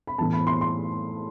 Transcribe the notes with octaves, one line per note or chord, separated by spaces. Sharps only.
B5
A2 E3 B3 A5
B5
C6
C6